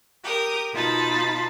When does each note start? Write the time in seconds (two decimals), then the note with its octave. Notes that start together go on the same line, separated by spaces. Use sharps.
0.24 G4 A#4 D#6
0.74 B2 D#4 F4 A5 B5 A6